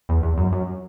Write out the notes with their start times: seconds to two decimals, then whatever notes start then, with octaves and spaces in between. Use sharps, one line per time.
0.09 E2
0.23 E2
0.38 F#2
0.53 F#2